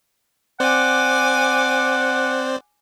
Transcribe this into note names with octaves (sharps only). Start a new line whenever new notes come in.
C4 C5 D5 F#5 G#5 D6